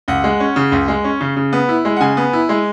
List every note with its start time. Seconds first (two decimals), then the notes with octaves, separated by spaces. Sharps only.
0.08 C#2 F#5
0.24 G#3
0.40 C#4
0.56 C#3
0.72 C#2
0.88 G#3
1.04 C#4
1.21 C#3
1.36 C#3
1.53 B3
1.69 E4
1.85 G#3
1.97 F#5
2.00 C#3 G#5
2.17 B3
2.33 E4
2.49 G#3